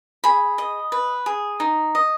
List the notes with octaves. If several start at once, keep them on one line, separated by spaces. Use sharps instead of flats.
G#4 B5
D#5
B4
G#4
D#4
D#5